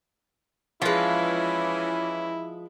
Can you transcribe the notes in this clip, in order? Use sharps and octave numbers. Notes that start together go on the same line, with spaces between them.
E3 F3 G#3 C#4 E4 F4 B4